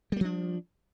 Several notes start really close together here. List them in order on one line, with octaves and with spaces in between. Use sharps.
G3 A#3 F3 D4